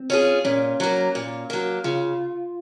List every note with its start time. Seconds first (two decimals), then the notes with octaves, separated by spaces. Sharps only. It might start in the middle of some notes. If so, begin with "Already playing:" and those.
Already playing: C4
0.10 C#4 F4 G#4
0.45 A#2 C#4
0.80 F#3 A#3
1.15 A#2
1.50 F#3 A#3
1.84 C#3 F4